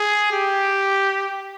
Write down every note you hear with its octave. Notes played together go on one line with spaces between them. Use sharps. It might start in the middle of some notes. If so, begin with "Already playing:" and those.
Already playing: G#4
G4